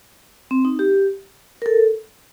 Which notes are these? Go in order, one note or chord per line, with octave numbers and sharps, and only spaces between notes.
C4
D#4
G4
A#4
A4